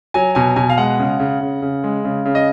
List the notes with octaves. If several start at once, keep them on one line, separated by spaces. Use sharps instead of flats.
F#3 G#5
B2 G#5
B2 G#5
F5
G#3 F#5
C#3
C#3
C#3
C#3
G#3
C#3
C#3
D#5